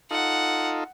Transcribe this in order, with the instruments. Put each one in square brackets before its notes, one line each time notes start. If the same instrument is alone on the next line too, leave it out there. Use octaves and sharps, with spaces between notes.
[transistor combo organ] D#4 F4 A4 [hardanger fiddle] F#5